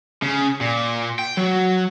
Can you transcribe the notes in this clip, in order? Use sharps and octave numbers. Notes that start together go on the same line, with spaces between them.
C#3
A#2
G5
F#3